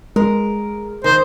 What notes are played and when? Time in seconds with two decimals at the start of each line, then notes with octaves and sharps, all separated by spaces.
0.16 G#3 A#4
1.04 D#3 C5